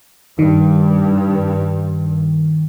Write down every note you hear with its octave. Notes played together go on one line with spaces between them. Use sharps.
G2 D#3